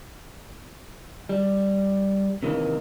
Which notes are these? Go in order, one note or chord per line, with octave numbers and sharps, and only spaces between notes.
G3
C3 D#3 E3 A#3